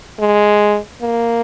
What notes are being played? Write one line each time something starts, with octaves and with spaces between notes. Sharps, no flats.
G#3
A#3